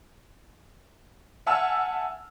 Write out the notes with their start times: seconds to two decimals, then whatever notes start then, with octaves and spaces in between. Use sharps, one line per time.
1.46 E5 F#5 G#5 A5 E6 F6